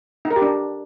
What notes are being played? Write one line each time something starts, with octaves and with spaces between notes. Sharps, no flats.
D#4
A#4
G4
D4